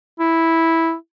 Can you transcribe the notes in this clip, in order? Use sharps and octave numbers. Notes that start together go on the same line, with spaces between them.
E4